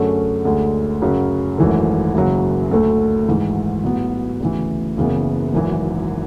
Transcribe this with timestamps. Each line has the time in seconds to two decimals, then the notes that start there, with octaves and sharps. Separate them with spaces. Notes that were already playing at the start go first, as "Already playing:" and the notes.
Already playing: F#2 D3 A3 C#4 G#4
0.45 D2 D3 G#3
1.02 F#2 C#3 F#3 C#4
1.58 G#1 F#2 E3 A3
2.15 F#1 F#2 C#3 F#3
2.72 D2 D3 A3
3.28 G#1 G#2 E3
3.84 A1 G#2 F#3 B3
4.40 D2 C#3 E3
4.97 F#1 F#2 C#3 E3 B3
5.54 G#1 F#2 E3